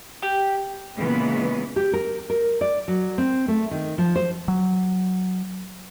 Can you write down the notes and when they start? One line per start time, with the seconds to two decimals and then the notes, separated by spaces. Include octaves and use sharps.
0.22 G4
0.96 A#2 C#3 E3 G#3 B3
1.76 G4
1.93 A#4
2.30 A#4
2.61 D5
2.88 F#3
3.18 C4
3.48 A3
3.71 D#3
3.98 F3
4.16 C5
4.48 F#3